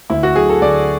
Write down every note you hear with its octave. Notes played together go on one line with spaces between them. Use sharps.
D2 E4
F#4
D3 F#3 G#4
A4
D2 D5